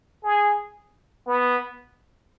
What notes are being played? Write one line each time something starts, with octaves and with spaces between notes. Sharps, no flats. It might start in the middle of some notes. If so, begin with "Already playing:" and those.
G#4
B3